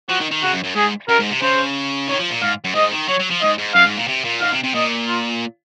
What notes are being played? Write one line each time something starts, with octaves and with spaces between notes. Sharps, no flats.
F3 F#4
D#3
D#3
C#3 F#4
F#2
F#2
G#2 G#4
F#2 A#4
G#2
C3
C#3 C5
D#3 C#5
F3
A#2
G#2 F5
F#2
G#2 D#5
D#3
F#3 C#5
F#3
F3
G#2 D#5
G#2
F#2 F5
G#2
A#2
C3
A#2
G#2 F5
C3
C3
A#2 D#5
F4